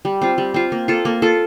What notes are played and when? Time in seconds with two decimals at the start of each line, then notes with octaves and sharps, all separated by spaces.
0.05 G3
0.22 C4 F4
0.38 G3
0.54 C4 F4
0.72 A#3
0.88 F4 A4
1.05 A#3
1.22 F4 A4